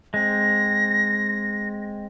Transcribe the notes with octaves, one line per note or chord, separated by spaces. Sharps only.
G#3 C4 A#6